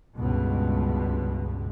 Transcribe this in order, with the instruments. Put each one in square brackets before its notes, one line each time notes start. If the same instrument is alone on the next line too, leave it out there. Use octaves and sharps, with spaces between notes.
[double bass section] C#2 G2 B2